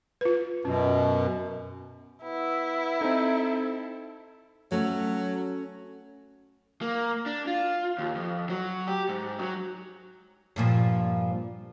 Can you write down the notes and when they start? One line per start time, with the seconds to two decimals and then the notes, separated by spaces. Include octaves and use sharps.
0.21 F4 B4
0.65 F#2 B2 C#4
2.23 B3 E4
3.01 C4 D#4 A4
4.72 F#3 A3 C#4
6.81 A#3
7.26 D4
7.48 F4
7.98 D#2
8.15 F2
8.50 F#3
8.88 G4
9.09 G#2
9.39 F#3
10.56 G2 A#2 F3